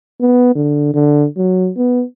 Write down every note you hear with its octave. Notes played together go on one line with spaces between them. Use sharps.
B3
D3
D3
F#3
B3